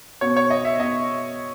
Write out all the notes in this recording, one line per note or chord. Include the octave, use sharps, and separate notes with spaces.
B2 C#5
C#5
D#5
E5
B2 D#5